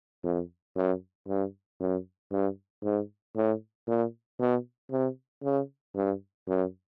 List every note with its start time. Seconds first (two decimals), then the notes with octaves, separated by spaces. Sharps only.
0.24 F2
0.76 F#2
1.28 G2
1.80 F#2
2.31 G2
2.84 G#2
3.36 A2
3.88 A#2
4.40 B2
4.91 C3
5.43 C#3
5.96 G2
6.48 F#2